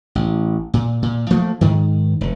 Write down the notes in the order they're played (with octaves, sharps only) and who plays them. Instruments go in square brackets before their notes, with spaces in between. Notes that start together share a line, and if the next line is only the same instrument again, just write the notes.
[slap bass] A1
A#2
A#2
F3 A3 A#3
G#2 D#3
F1